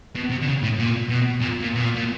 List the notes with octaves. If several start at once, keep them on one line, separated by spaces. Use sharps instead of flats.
B2
C3
D3
C#3
A2
A#2
B2
A#2
A#2
B2
A#2
A#2